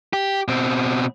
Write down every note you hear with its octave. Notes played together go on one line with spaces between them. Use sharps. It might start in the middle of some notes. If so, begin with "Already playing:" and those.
G4
B2 C4